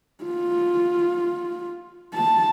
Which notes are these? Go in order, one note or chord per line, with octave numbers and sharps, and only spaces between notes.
F4
A5